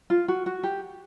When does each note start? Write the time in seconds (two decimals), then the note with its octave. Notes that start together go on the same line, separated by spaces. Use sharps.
0.10 F4
0.28 F#4
0.46 F#4
0.63 G4